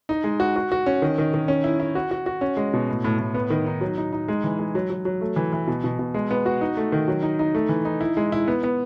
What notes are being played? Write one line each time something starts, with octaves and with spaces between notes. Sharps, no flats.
D#4
G#3
F#4
F#4
F#4
C#4
D#3
D#3
D#3
C#4
E4
E4
F#4
F#4
F#4
C#4
G#3
B2
A2
A2
A2
B3
D#3
D#4
F#3
D#4
D#4
G#3
E3
G#3
F#3
F#3
F#3
A3
E3
E3
B2
B2
B2
G#3
B3
F#4
D#4
A3
D#3
F#3
D#4
D#4
A3
E3
D#4
E4
G#3
E4
B3
B3